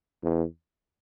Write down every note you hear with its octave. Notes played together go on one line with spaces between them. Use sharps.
E2